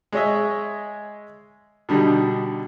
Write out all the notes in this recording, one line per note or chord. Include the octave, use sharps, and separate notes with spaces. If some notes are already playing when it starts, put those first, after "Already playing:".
G#3 G#4 C#5 D#5 E5
B2 D3 G3 D4 D#4